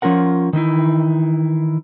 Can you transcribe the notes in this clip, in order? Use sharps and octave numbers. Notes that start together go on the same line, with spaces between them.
F3 C#4 F4 A#4 F#5
D#3 E3 D#4 E4